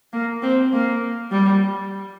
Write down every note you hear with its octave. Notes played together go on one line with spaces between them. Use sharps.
A#3
C4
A#3
G3